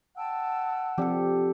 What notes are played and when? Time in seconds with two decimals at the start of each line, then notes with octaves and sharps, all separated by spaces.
0.17 F#5 G5 A5 E6
0.98 F3 C4 G4 A4 D5